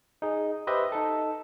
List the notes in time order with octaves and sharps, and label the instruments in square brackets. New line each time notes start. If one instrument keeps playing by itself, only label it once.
[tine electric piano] D#4 G#4
G4 B4 C5 D#5 E5
D#4 A4